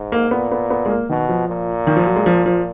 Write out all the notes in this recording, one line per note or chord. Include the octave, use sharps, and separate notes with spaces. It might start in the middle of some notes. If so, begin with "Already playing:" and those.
Already playing: G#2
A#3
A#2 B3
B3
B3
G#3
A#3
B2 D#3
F3
A#2
D#3
F3
F#3
G#3
F3
F3